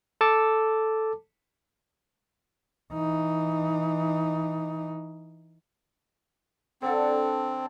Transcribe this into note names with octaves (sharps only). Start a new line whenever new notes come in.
A4 A5 D6
E3 D#4
D3 C4 D4 A4